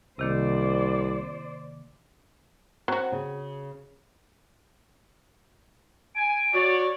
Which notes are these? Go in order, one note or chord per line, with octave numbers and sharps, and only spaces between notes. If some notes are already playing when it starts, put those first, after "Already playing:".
C2 C3 D#3 A#3 C5 D5
F#3 C4 F#4
C#3
G#5 D7
F#4 C#5 D5